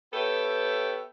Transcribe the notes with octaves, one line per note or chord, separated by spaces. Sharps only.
B3 G4 A4 C#5 E5 G5